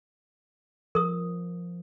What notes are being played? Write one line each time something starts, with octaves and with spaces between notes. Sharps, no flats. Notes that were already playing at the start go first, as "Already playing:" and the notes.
F3 A#4 D#6